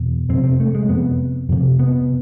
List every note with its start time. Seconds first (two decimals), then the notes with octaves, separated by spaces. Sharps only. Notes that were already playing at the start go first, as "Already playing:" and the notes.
Already playing: E2 B2
0.29 F2 C3 C4
0.44 C4
0.60 A3
0.75 G#3
0.89 F2 C3 B3
1.49 F2 C3
1.79 B3